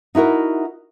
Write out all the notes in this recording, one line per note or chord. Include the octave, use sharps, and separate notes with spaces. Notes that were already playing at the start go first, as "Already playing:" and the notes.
D#4 E4 F#4 A#4